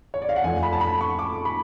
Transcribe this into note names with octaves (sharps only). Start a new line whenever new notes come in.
C#5
D5
F5
F#5
F2 F3 A3 G#5
B5
A5
B5
C#6
D6
B5